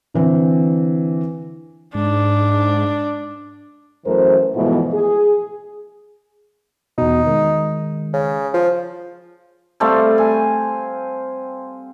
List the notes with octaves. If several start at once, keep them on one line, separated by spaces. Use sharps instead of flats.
D3 E3 C4
G#2 D4
F#2 E3 A3 A#4 C5
G#2 B2 E3 F3 A3 B3
G#4
E2 B2 D#4
D#3 G#3
C#3
F3
G3 A3 C4 F5
G#5